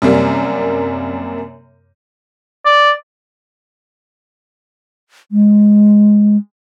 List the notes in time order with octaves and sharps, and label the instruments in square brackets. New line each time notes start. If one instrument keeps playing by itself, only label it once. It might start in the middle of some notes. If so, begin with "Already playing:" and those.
[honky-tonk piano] F#2 C3 G3 A#3
[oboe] D5
[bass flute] G#3